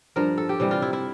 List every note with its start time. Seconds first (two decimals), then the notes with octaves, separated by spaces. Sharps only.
0.16 G2 F3 A#4
0.38 A4
0.49 G4
0.60 C3 E3 G3
0.71 F4
0.82 E4
0.93 E4